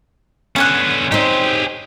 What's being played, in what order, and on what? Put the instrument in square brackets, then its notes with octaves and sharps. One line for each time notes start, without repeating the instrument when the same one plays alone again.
[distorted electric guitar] D3 B3 [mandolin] C#4 G#5 F#6
[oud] C4 D#4 [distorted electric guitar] G4 G#4